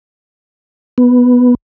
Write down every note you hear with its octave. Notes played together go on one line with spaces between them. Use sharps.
B3